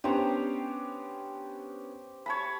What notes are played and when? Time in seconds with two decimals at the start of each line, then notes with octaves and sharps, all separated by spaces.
0.04 B3 C#4 D4 G4 C5 A#5
2.26 C#5 A5 B5